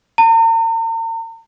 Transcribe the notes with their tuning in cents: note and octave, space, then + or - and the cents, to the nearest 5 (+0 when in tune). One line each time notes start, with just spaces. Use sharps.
A#5 -45